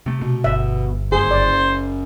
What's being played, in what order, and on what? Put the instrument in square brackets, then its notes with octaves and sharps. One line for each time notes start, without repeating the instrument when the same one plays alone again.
[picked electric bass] C3 A3
[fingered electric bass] B2
[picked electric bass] G1 [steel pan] E5
[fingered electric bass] F#1 [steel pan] G#4 [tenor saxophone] C5
[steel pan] D5